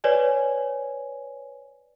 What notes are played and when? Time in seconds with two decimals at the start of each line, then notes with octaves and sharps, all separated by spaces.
0.04 B4 C#5 D5 G#5